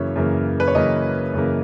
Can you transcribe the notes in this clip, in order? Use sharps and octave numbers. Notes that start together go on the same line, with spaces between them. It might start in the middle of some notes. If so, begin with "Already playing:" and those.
Already playing: F#2 C#3 E3 A#3 C#5
F#2 C#3 E3 A#3
B4
C#5
F#2 C#3 E3 A#3 D#5
F#2 C#3 E3 A#3